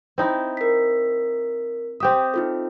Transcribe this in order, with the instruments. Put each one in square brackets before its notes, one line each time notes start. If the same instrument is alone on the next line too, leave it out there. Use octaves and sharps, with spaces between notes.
[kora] C4 D#4 E4
[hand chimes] A#4 B6
[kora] C4 G4 E5 [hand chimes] D#6
[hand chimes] D#4 F4 A4